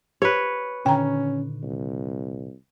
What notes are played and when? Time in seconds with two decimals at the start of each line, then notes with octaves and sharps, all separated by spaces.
0.22 G4 B4 C#5
0.86 A#2 D3 D#3 C#4 G5 A#5
1.63 C2